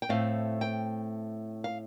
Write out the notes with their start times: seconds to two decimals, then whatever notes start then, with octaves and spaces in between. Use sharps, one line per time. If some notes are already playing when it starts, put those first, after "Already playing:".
0.02 G5
0.09 A2 A3 C4 F5
0.61 G5
1.64 F5